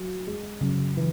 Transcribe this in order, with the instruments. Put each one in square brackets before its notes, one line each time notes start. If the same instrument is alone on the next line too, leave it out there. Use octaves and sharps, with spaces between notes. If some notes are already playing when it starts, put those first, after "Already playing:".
Already playing: [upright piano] F#3
G#3
[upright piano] F#2 [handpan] C#3
[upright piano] E3